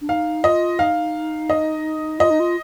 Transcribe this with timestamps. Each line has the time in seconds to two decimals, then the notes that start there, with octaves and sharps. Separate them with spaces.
0.01 D4
0.08 D#4 F5
0.43 F4 D#5
0.79 D#4 F5
1.50 D#5
2.19 F4 D#5
2.30 D#4
2.40 F4